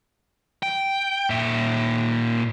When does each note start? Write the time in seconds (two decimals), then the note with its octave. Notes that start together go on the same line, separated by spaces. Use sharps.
0.63 G5
1.30 A#2 E5